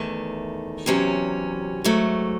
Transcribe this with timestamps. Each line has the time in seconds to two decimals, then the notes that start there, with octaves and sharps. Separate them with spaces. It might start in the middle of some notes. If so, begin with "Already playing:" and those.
Already playing: E2 D#3 A3
0.86 E2 C3 F#3 C#4
1.84 G#2 F#3 A3